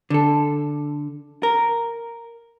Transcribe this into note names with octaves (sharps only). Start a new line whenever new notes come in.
D3 A4
A#4